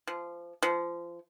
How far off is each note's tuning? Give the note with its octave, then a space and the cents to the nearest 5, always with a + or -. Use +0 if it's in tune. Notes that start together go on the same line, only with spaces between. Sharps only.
F3 -20
F3 -25